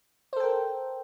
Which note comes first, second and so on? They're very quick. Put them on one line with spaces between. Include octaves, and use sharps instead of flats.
C5 A4 G5 A#4